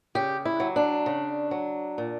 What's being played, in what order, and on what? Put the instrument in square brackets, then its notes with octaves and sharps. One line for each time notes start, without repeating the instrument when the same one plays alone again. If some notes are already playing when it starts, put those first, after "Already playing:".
[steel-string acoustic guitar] C#3 G4
E4
F#3
D4
C#3
F#3
A#2